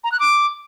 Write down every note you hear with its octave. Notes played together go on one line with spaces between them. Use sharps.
A#5
F#6
D6